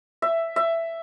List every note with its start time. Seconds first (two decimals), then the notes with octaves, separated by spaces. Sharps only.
0.22 E5
0.56 E5